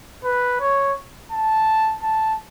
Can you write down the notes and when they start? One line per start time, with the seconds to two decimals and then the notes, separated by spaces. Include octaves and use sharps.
0.24 B4
0.60 C#5
1.32 A5
2.03 A5